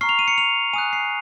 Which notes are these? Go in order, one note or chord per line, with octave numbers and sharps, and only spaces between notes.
A#5 C#6 F6 C7
F7
D#7
C#7
F7
G#5 D#6 F#6 D#7
C7